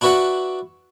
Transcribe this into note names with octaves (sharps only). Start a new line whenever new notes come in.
D4 E4 F#4 B4 D5 F#5